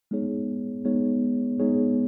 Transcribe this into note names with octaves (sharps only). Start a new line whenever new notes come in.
G#3 B3 D#4 G#4 C#5
G#3 B3 D#4 G#4 C#5
G#3 B3 D#4 G#4 C#5